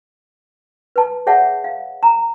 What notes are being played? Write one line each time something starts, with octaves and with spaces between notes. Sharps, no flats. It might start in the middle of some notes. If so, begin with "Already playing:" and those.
B4 A5
G#4 C#5 E5 F#5 A5
F5
A#5